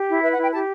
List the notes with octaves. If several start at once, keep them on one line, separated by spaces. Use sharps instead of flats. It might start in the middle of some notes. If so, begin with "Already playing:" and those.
Already playing: G4
E4
B4 E5
F#5
E4 G5
G4 A5